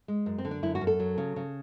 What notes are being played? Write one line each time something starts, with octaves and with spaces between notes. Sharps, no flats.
G#3
F#2
C4
D3
D4
F#2 E4
F#4
F#2
A4
F#3
C#3
C#3